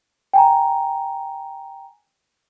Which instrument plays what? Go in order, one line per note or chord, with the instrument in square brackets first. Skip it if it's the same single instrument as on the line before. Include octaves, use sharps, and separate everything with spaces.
[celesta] G5 G#5 A#5